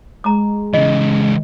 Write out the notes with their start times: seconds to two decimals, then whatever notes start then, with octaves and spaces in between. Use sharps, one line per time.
0.24 G#3 A#5 D6
0.74 C#3 E3 D#5